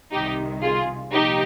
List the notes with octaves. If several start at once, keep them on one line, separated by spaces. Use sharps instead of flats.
C2 C3 D#3 D#4 G4
F4 G#4
C2 A#2 F3 D#4 G4